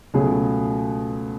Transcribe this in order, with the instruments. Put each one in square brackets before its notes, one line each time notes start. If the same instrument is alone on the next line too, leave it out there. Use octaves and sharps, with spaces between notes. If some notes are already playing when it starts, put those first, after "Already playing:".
[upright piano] C#2 B2 F#3 A3 G#4